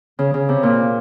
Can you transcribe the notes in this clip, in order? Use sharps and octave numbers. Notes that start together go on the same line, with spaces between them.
C#3
C#3
C3
A#2